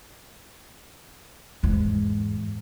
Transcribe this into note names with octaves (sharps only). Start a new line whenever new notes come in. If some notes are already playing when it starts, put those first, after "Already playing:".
E2 G#2